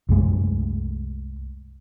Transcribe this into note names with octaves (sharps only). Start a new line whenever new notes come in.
C2 F#2 G#3 A3